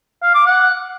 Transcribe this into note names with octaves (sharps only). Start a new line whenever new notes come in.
F5
D6
F#5